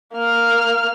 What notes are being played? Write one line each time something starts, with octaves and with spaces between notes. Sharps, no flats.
A#3 F6